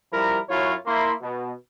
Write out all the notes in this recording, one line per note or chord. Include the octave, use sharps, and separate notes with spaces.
F3 G3 E4 A#4 A#5 B5
F#2 F#3 E4 F4 C#5
A#3 E4 C6
B2